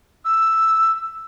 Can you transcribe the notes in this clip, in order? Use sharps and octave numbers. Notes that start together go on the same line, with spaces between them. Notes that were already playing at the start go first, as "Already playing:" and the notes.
E6